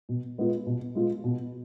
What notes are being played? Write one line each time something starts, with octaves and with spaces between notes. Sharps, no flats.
B2
G#3 B3 F4
B2
G#3 B3 F4
B2